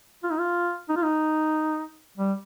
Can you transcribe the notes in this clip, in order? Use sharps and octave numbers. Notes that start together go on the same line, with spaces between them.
F4
D#4
F4
D#4
F4
D#4
G3